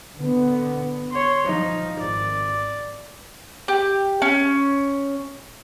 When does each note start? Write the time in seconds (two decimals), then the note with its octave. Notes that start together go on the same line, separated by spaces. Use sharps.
0.17 D3 B3
1.11 C#5 C6
1.46 F3 D#4
1.98 G#1 D5
3.68 G4
4.22 C#4